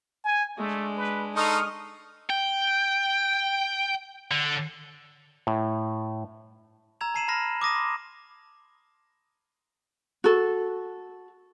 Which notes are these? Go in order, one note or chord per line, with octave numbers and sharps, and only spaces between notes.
G#5
G#3 A3 D4
B4
D#4 A4 C6 C#6 D#6 F6
G5
D3
A2
A#5 E6 G#6 F7
A5 A#5 C7 D#7 E7 F#7
A5 B5 F6 A#6 C7
D6 D#6 A#6 D#7
C6
F#4 A4